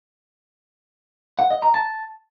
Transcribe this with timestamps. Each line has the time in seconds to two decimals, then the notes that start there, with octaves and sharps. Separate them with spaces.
1.39 F#5
1.50 D#5
1.62 A#5
1.74 A5